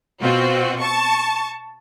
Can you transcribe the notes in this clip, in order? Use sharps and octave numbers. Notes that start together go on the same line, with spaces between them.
B2 C4 F4 F#4
A5 C#6